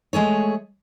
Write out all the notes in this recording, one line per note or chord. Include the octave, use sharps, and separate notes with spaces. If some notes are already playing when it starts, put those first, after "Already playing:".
G#3 A3 G#4 C#5